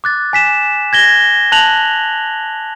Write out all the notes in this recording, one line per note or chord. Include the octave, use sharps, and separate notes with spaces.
D6 F#6 A6
G#5 B6 E7
G#6 A#6 G7
A5 F#6 F7 F#7